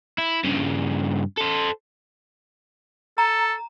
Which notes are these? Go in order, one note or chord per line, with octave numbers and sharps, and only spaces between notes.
E4
G2 C#3
A4 C5
A4 A#5